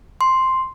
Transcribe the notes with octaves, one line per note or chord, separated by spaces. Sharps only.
C6